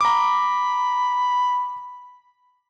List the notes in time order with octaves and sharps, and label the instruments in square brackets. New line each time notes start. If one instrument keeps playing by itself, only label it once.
[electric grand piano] A#5 D6 [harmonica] B5